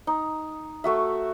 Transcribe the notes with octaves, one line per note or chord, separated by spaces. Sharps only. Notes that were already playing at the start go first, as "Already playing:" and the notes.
D#4
A3 F#4 E5